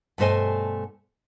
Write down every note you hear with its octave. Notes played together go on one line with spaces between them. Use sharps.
G2 B2 A3 C5 D#5 G#5